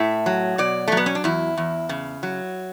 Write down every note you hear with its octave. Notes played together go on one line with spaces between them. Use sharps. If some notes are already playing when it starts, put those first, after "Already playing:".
Already playing: A2 E5
F#3
B2 D5
A3
F#3
B3
C#4
D4
E2 E4
E2
C#3
F#3